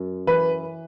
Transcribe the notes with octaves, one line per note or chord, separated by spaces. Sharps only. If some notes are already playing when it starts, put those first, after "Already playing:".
Already playing: F#2
E3 B4